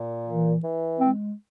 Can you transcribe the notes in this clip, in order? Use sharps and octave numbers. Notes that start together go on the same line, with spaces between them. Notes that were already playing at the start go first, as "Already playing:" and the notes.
Already playing: A#2
E3
E3
G#3 C4